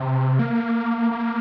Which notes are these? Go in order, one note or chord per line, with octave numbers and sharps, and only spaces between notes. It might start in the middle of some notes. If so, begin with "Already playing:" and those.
Already playing: C3
A#3
A#3